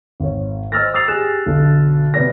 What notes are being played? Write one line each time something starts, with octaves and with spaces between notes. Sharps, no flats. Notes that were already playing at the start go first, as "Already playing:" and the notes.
G#1 C#5
C5 D#5 E6 F6 A6 A#6
D#6 E6 A6 C7 F7
G4 G#4 F#6 E7
B1 D3
C3 B3 D5 A#6